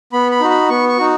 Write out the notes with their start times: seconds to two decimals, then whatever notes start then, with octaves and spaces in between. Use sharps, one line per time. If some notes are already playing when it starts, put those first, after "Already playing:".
0.13 B3 B5
0.32 B5
0.41 D#4 F#4
0.50 B5
0.69 B3 C#6
0.89 C#6
0.98 D#4 F#4